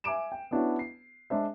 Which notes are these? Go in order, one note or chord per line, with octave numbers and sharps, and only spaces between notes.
E5 G#5 D6 D7 E7
G5
B3 C#4 D4 E4 F#4 C#5
C7
G#3 D4 C5 E5